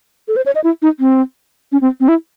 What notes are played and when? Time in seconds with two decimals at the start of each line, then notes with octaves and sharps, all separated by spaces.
0.28 A4
0.36 C5
0.46 C#5
0.55 D#5
0.64 E4
0.82 D#4
1.00 C4
1.72 C#4
1.81 C4
2.00 C4
2.08 E4